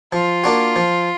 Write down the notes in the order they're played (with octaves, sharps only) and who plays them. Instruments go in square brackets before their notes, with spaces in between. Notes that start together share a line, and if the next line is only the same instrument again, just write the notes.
[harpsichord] F3 [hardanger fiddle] F4
[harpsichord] A#3 D4 F#4
F3